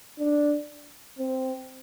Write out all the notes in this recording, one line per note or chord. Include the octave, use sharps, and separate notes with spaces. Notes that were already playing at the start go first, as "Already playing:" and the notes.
D4
C4